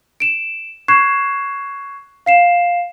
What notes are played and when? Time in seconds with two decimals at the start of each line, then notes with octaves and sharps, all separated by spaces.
0.20 D7 E7
0.88 C#6 F#6 G#6 C7 E7
2.26 F5 C7 E7